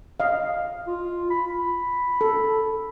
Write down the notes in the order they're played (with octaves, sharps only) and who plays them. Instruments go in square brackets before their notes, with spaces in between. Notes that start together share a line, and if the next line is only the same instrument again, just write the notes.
[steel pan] D#5 F5
[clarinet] F4
B5
[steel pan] A4